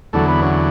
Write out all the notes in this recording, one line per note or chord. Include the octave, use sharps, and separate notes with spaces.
E2 D3 F#3 A3
B3
C#4